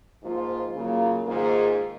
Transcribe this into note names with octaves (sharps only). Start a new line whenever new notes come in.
G#2 F3 A#3 F4
C#3 F#3 A#3 F4
G#2 D#3 A#3 F4 G#4